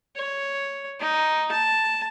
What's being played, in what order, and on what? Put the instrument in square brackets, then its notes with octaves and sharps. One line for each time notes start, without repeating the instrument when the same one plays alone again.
[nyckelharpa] C#5
D#4
A5